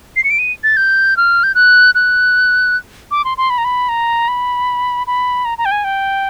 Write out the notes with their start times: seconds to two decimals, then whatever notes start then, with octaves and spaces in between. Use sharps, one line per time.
0.16 C7
0.24 C#7
0.30 D7
0.39 D#7
0.64 A6
0.77 G6
1.17 F6
1.43 G6
1.55 F#6
1.95 F#6
3.11 D6
3.25 C6
3.38 C6
3.50 B5
3.58 A#5
3.64 B5
3.89 A#5
4.28 B5
5.07 B5
5.45 A#5
5.58 A#5
5.65 G5
5.71 G#5
5.84 G5